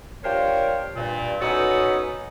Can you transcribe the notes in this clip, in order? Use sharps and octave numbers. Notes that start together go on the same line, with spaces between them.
D4 F4 G4 A#4 C5 C#5
G2 A#2
B3 C#4 D#4 F#4 A4 C#5